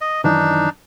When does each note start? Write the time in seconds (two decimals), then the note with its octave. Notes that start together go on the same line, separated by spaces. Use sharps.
0.01 D#5
0.24 F#2 D#3 E3 D4 D#4